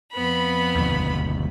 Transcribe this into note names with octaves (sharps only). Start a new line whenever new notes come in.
F2 B3 B5
G1 D#2